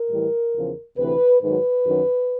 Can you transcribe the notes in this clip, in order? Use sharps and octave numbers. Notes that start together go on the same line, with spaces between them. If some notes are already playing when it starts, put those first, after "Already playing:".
Already playing: A#4
A2 E3 G3
E2 C#3 F3
D2 C3 E3 B4
G#2 D#3 F#3 B4
F#2 D#3 F#3